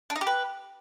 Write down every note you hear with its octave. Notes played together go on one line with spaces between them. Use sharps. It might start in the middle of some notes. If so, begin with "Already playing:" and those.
D4
D#4
G4
B4